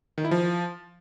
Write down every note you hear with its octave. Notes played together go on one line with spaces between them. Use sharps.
D#3
E4
F3